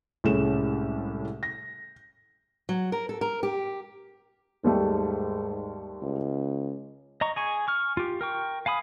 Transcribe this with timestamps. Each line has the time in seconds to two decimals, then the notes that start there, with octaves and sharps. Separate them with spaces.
0.24 C2 A2 G#3 C#4 A4 E7
1.43 A#6
2.69 F#3
2.92 A#4
3.09 A4
3.21 A#4
3.43 G4
4.64 D#2 G#2 G3 A3
6.02 C#2
7.21 D#5 A#5 C#6
7.36 G#4 G#5 C#6
7.68 C#6 F6
7.97 F4 G4
8.21 A#4 G5 C#6
8.66 F5 G#5 B5 D#6